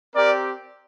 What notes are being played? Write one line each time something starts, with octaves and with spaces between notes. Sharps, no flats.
C4 G4 A#4 D5